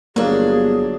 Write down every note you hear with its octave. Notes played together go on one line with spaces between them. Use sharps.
G1 F#3 A#3 D4 G#4